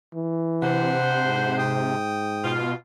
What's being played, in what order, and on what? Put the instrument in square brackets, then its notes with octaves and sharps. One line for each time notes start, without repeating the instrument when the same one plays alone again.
[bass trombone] E3
[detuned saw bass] C3 [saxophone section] D4 B4 C5 [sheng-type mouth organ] F#5
[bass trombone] G#2
[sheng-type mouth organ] G5 D#6
[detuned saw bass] B2 [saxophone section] F4